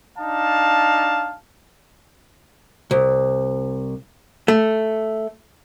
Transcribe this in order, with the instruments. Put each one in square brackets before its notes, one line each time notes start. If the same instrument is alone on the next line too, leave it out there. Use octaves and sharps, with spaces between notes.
[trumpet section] D4 D#4 F5 A5
[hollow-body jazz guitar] C2
A3